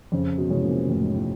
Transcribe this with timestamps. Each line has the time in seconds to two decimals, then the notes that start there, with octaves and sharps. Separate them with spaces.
0.12 F2 C#3
0.38 B2
0.50 C3 E3 G#3 C#4
0.64 A#2
0.88 F2 A2
1.01 G#2
1.14 A2